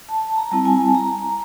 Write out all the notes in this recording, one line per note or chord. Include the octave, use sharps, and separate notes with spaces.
A5
A5
A#5
G3 C4 E4 A5
G#5
A5
A#5